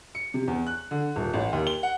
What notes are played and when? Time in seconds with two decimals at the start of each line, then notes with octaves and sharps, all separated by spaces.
0.15 C#7
0.34 C3
0.48 E2
0.67 F#6
0.91 D3
1.16 D#1
1.33 A1
1.53 D#2
1.67 G7
1.83 F#5